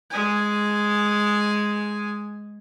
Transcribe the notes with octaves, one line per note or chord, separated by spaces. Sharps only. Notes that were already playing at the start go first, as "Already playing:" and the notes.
G#3 G#5